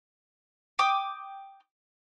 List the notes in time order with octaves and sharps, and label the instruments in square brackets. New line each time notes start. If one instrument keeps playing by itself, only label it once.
[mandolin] G5 D6 D#6